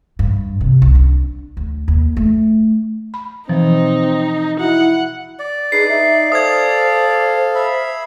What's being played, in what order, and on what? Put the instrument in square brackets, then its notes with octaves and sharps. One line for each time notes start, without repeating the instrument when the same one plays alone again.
[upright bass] G2
C3
C2
D4
D2
D#2
A3
[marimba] B5
[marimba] B2 E3 F3 [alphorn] C4 [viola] D#4
[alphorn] E4 [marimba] F#4 [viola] F#5
[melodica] D5
[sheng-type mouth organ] D4 D#4 B4 [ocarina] G#4 [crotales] C7
[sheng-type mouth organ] D#4 [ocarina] E5
[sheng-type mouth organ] A4 F5 [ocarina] C5 [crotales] D#6 G#6
[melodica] E5 B5